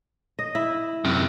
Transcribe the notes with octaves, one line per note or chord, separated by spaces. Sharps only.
D#5
E4
F#2 C3